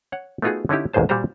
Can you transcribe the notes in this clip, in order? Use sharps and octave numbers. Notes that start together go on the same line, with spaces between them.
C#5 F#5
A3 B3 D#4 F4 F#4 G#4
D3 C#4 D#4 E4 G4
A1 D#2 G#2 G#4 C5 A5
A#2 G3 F#4 G4 C5 A#5